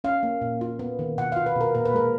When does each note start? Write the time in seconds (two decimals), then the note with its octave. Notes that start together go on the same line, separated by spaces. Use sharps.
0.04 C#4 F5
0.23 A#3
0.42 A#2
0.61 F4
0.79 B3
0.99 D#3
1.18 B2 F#5
1.32 F5
1.36 F4
1.46 B4
1.56 B2
1.61 A#4
1.75 A#2 A#4
1.85 B4
1.94 G#3 A#4